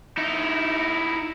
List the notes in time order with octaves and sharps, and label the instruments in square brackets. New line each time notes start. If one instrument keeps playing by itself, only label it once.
[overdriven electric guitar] D#4 E4